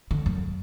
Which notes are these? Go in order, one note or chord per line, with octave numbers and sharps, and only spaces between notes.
D3
F#2